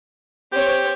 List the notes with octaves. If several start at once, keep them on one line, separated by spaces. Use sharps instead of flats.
C4 G4 C#5